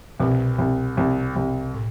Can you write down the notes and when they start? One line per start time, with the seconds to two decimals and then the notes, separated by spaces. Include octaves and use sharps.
0.20 C2 B2
0.58 C2
0.97 C2
1.36 C2
1.74 A2